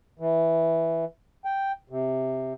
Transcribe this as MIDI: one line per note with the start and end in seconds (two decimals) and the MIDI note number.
0.19 1.05 52
1.45 1.72 79
1.90 2.53 48